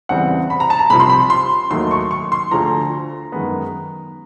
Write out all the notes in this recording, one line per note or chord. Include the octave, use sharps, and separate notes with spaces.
E2 C#3 E3 G3 C4 F#5
B5
A#5
A5
A#5
C2 C3 F3 B5
C6
B5
C6
D#2 D#3 F#3 A3 C6
C#6
C#6
C6
D2 D3 F3 A#5
F#2 D#3 G#3 B3